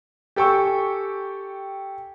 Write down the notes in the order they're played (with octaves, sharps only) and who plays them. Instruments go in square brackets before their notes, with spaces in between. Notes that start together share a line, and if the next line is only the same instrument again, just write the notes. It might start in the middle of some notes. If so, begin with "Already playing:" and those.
[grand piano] G4 A4 G5 G#5 C#6 E6